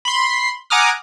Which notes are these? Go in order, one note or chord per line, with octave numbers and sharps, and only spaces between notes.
B5 C6
F#5 G#5 A#5 D6 D#6 F6